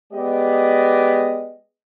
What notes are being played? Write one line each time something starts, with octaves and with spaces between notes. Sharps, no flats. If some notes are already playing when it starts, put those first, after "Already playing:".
G#3 B3 G4 D5 D#5